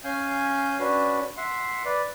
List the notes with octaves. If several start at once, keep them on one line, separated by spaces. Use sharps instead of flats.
C#4 F5 G#5 G6
C#4 D4 F#4 B4
E5 F#5 C6
B4 D5